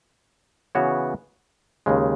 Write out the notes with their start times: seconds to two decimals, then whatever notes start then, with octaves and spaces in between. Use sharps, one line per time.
0.75 C#3 E3 B3 F#4 C#5
1.86 D#2 C#3 G#3